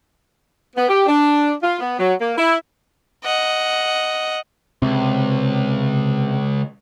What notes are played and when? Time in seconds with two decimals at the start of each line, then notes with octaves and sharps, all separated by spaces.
0.76 B3
0.88 G4
1.06 D4
1.63 F4
1.79 B3
1.98 F#3
2.20 A#3
2.38 E4
3.24 D#5 F#5
4.82 C#2 C3 C4